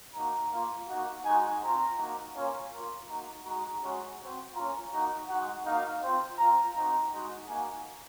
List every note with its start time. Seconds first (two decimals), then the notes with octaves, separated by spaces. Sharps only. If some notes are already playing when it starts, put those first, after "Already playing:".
0.14 A#3 D#4 F#4 A#5
0.51 A#3 F4
0.88 A#3 D#4 F#4
1.25 G#3 D#4 F#4 G#5
1.61 C4 F4 A#5
1.98 A#3 D#4 F#4
2.34 A#3 C#4 F4
2.72 A#3 F4
3.08 A#3 D#4 F#4 A#5
3.45 G#3 D#4 F#4 A#5
3.81 G#3 C#4 F#4
4.18 C4 F#4
4.55 A#3 C#4 F4 A#5
4.92 A#3 D#4 F#4 A#5
5.29 G#3 D#4 F#4 F#5
5.65 A#3 D#4 F#4 F5
6.02 C4 F4
6.38 C4 F4 A#5
6.75 C4 D#4 F#4 A#5
7.12 G#3 D#4 F#4
7.48 A#3 D#4 F#4 G#5